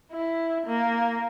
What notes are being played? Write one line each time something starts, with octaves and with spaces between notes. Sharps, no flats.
E4
A#3